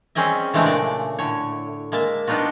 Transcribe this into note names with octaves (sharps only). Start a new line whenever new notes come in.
G3 C4 C#4 G#4 D#5 E5
C#3 E3 G#3 A3 C4 D4
A#2 C#3 A3 D5
A2 D3 C#5
G#3 A#3 E5 A5
G3 B3 D4 D#4 F4 F#4